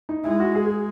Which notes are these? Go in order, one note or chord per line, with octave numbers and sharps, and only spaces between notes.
D#4
G#3 E4
F#4
G#4
G#4